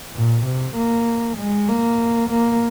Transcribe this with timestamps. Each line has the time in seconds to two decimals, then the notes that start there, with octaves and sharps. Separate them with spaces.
0.14 A#2
0.45 C3
0.76 A#3
1.38 G#3
1.68 A#3
2.30 A#3